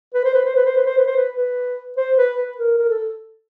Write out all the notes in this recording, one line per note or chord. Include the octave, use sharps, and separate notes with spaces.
B4
C5
B4
C5
B4
C5
B4
C5
B4
C5
B4
B4
C5
B4
B4
A#4
A#4
A4